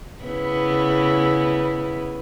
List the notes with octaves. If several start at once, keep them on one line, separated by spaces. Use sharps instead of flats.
C#3 B3 E4